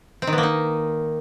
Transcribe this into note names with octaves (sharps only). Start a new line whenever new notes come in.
C4
D#3
B3
A#3
D#4